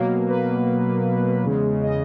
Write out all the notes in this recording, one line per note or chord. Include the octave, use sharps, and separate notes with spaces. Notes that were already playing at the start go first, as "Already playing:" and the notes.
Already playing: B2 F#3 A#3
B4
E2 C#3 G#3
D#5